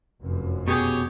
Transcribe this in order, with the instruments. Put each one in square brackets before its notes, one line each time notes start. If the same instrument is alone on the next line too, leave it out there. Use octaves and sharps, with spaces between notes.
[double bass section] F1 F#2
[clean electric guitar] B2 [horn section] G4 G#4 C#5